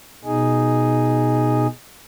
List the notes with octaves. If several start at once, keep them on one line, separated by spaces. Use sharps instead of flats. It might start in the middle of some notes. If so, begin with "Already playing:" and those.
B2 D#4 G#4